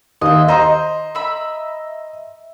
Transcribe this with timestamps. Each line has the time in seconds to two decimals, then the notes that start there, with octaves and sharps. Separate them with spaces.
0.21 D#2 D#5 E5
0.48 C5 D#5 A#5 C6
1.15 E5 B5